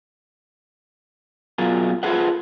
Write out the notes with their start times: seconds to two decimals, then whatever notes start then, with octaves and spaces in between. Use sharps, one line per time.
1.58 B2 F#3 F4 G#4 A#4
2.03 F4 G#4 A4 B4 C5 F#5